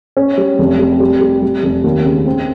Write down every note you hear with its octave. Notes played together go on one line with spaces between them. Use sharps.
C#4
G3
F1
G3
G3
G3
G3
F1
D#2
C#3
C4